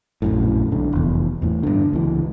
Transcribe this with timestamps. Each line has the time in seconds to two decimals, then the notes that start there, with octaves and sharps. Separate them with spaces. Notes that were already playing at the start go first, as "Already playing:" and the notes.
0.22 A#1 F#2 A2
0.72 B1 D3
0.93 F1 E2
1.42 E2 A2
1.63 G2 D3
1.93 C#2 E3